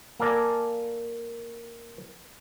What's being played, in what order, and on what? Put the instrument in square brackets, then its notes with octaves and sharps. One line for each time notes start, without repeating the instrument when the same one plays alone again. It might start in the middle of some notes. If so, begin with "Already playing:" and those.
[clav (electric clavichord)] A#3 A4 A#4 D5 G#5